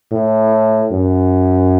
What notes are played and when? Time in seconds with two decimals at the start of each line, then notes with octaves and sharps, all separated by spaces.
0.12 A2
0.92 F#2